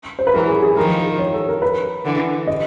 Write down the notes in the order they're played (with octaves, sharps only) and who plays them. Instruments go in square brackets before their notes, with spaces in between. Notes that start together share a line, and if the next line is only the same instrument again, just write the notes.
[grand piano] C5
B4
[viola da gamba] E3 F#3 [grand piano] A#4
[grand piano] G#4
G#4
[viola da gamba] D#3 F3 [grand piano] A#4
[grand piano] A#4
C#5
A4
A#4
B4
[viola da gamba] D3 E3
[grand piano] D#5